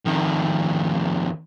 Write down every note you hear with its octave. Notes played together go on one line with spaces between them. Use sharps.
F2 D#3